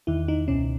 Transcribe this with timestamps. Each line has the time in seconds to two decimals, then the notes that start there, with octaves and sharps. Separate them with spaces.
0.07 E2 D#3 E4
0.28 D#4
0.48 C#2 B2 C#4